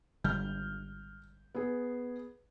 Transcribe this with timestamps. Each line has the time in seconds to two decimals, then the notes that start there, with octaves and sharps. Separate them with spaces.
0.24 G#1 D3 G3 F6 G6
1.55 B3 G#4